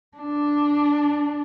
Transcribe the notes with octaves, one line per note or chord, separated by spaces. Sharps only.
D4